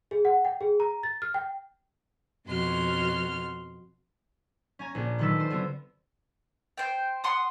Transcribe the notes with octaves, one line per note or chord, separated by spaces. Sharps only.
G#4
F#5
G5
G#4
A#5
A6
F6
G5
F2 B2 F#4 C6 F6
C#4 G#5 A#5
A#1 D5
D3 D#3 F#3 A4 B4 E6
F4 C5
D3 B3 C4 E4 F#4
C5 G5
F#5 C6 D#6